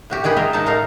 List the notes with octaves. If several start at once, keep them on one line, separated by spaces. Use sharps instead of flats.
A2 F#4 G4
D#3 G4 G#4 B4
G#3 A#3 F4 A#4 D#5 E5
A2 D#3 A#3 D#4 A4 A5
A2 D#4 A4 A#4 F5